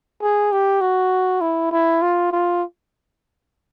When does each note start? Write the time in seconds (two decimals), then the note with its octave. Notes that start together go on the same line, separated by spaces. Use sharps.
0.23 G#4
0.52 G4
0.81 F#4
1.41 E4
1.72 E4
2.02 F4
2.32 F4